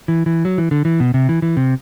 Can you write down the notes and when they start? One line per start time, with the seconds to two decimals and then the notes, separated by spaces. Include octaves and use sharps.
0.08 E3
0.26 E3
0.45 F#3
0.58 E3
0.71 D3
0.85 E3
1.00 B2
1.14 C3
1.29 E3
1.42 E3
1.57 C3